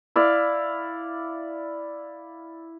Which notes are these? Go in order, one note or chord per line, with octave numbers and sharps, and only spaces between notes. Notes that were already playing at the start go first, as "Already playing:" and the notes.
E4 D5 F5